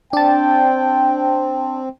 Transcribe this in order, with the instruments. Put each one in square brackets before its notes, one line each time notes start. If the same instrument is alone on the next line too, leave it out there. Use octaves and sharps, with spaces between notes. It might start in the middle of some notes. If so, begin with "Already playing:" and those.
[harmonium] C4 [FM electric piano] D4 A5 [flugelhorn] G5